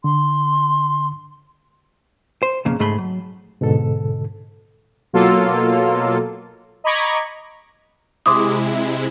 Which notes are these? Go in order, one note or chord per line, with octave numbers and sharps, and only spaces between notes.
D3 C6
C5
B1 F2 C#3 A#3
C#2 G#2 A3 G#4 B5 C6
F#3
G#2 B2 D3 A4
B2 F#3 A#3 F4 A4
D#5 A#5 B5 C#6 D6 G#6
C3 G#3 E4 C6 D6 D#6